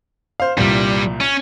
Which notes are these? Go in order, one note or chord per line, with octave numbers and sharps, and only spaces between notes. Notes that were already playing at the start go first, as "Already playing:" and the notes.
C5 F5
C2 G2 A#2 G3
C#4